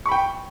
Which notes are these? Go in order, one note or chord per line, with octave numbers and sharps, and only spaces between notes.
G5 B5 C#6